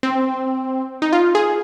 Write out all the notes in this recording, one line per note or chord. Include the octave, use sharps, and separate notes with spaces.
C4
D#4
F4
G#4